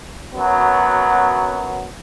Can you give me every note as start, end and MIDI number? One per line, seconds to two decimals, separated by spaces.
0.34 1.88 42
0.34 1.88 54
0.34 1.88 59